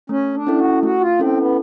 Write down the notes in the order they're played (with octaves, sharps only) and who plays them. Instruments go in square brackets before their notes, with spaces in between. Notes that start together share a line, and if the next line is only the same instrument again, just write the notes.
[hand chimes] A3 [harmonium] C#4
[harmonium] D4
[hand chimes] C#4 E4 A4
[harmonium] F#4
[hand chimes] A3 [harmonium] F#4
[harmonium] F4
[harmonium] C4 [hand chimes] C#4 E4 A4
[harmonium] B3